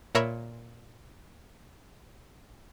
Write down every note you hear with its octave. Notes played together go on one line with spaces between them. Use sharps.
A#2 A#4 C#5 E5 A#5 B5